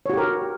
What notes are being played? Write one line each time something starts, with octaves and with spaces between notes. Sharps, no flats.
F#4 G4 A#4 C#5